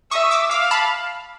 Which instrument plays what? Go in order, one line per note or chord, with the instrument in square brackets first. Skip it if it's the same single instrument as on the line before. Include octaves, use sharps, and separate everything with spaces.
[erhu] E5 [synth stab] C#6 D#6
[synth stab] D6 E6
[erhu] F5 [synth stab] D6 E6
[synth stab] A5 B5